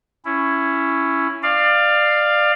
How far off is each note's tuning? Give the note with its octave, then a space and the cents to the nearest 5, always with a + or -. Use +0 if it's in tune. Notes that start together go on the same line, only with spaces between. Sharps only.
C#4 +0 E4 +10
D5 +25 F5 +0